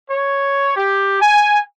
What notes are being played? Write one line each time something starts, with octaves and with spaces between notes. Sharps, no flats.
C#5
G4
G#5